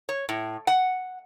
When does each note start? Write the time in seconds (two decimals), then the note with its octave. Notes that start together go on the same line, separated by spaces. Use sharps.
0.09 C#5
0.29 A2
0.67 F#5